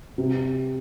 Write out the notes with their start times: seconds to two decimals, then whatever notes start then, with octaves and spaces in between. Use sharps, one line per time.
0.18 C3